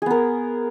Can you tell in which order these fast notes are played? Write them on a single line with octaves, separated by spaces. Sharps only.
G#4 B3 A#4